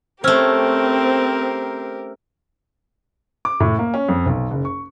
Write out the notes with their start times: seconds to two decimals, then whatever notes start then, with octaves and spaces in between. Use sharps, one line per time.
0.24 A3 C4 C#4 G4 A#4 C5 E6 F6
3.45 D6
3.60 A2
3.79 A#3
3.94 C#4
4.08 F2
4.26 B1
4.51 F#1
4.65 C#6